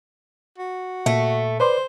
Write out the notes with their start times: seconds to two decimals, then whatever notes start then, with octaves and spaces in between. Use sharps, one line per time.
0.58 F#4
1.06 A#2 A3
1.60 B4 C5 D5 C6